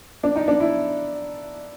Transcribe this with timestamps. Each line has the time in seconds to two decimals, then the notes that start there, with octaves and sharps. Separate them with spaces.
0.23 D4
0.36 D#4
0.48 D4
0.60 E4